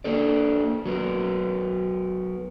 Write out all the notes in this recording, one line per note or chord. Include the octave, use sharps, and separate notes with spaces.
A#3 D4 A4 D5
F#3 B3 A#4